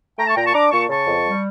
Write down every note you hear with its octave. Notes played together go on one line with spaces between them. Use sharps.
A3 G5 A#5
A5 C#6
A#2 G5 A#5
A5 C#6
D4 A#5 D6
A#2 A5 C#6
C#3 A5 C#6
F2
G3